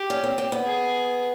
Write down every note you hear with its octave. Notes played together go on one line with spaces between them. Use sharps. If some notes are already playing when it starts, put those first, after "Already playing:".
Already playing: G4
C#4
C4
C4
B3
G#4